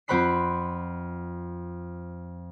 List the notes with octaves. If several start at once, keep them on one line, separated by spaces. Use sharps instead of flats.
F2 C4 C5 F#5 B5 C7